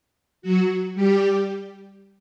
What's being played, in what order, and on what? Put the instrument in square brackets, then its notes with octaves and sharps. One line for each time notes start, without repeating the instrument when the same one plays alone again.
[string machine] F#3 F#4
G3 G4